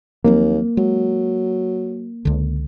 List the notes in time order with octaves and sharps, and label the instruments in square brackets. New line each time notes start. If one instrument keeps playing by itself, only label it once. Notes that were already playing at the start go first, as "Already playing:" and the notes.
[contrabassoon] D#2 [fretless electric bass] F3 F#3 C4 [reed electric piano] A#3
[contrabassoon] F#3 [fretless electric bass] G#3
[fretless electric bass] C#2 D3